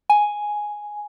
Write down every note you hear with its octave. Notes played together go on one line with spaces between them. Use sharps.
G#5